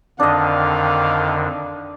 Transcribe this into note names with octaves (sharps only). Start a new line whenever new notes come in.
F2 D3 D#3 D4 D#5 F5